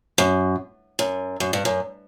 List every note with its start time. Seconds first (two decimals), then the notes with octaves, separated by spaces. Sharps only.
0.18 F#2
0.99 F#2
1.40 F#2
1.53 G2
1.65 F#2